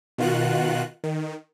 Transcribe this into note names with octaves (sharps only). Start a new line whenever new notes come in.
B2 D#3 F4 F#4 F#6
D#3